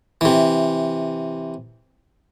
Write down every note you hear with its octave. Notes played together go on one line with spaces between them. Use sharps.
C3 E3